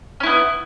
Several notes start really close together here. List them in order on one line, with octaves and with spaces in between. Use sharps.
C#4 E4 B3